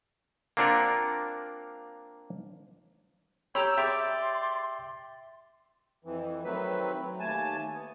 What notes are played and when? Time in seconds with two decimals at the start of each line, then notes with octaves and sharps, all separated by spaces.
0.57 A#3 C4 D4 F4 A#4 F#5
3.55 G4 C#5 G5 A#5 B5 E6
3.77 G4 G#4 C#5 D5 E5 G5 C6
6.05 F2 E3
6.44 D#3 F#3 A3 C4 B4
7.01 F#3
7.20 D#2 A3 G#5 A5
7.74 B3